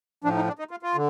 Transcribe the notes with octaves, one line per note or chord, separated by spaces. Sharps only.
A2 F3 D4
D#4
D4
D#4
F4
F4
D3